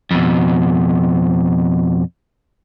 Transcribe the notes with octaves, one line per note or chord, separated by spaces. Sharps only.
F2 B2